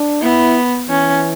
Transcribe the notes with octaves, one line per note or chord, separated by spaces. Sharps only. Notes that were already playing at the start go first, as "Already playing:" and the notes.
Already playing: D4
B3 E4
E3 C#4